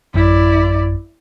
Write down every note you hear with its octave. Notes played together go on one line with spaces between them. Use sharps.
A1 F#2 E4 D5